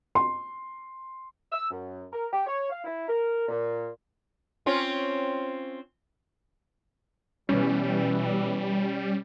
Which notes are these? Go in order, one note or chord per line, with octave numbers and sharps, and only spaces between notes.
C6
E6
F#2
A#4
G4
C#5
F5
E4
A#4
A#2
C4 C#4 F4
B2 E3 G3 C#4